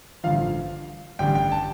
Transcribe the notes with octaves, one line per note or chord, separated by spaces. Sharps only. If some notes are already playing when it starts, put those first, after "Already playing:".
A1 G2 D3 F3 F5
A1 G2 D3 G3 D4 G5
G5
A5